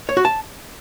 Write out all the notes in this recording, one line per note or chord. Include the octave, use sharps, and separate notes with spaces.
C#5
F#4
A5